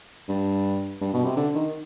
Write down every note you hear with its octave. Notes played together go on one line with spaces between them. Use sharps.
G2
G2
B2
C3
D3
D#3